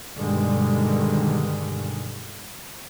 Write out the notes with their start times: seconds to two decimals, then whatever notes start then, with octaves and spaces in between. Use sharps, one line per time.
0.17 G2 B2 D3 D#3 G3 G#3